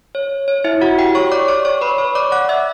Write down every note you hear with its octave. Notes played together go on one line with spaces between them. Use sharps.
C#5
C#5
E4 E5
F#4 F#5
G4 G5
C#5 C#6
D5 D6
C#5 C#6
C#5 C#6
B4 B5
C#5 C#6
D5 D6
F#5 F#6
E5 E6